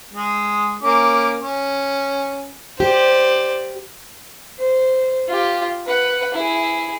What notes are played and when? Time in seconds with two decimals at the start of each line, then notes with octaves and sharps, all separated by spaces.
0.14 G#3
0.83 A#3 C#4 D6
1.40 C#4
2.80 G4 C5 D5
4.58 C5
5.28 F4 G4
5.86 B4 F#5
6.34 E4 G#4